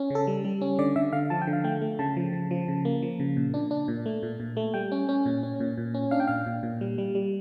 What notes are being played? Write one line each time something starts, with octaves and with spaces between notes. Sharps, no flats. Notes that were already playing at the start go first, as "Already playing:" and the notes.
Already playing: C#4
C#3 A4
G3
G3
C#4
D3 D5
D3 E5
D3 F5
F3 A5
G5
D3
F5
A3 G5
A3
C#3 A5
F3
C#3
F3
C#3
A#3
F3
C#3
A#2
D4
D4
A#2
A3
A#2
A#2
A3
G3 G5
C#4
C#4
A#2
C#4
A#2
A#2
C#4
D4 F5
G5
A#2 F5
A#2
A#2
G3
G3
G3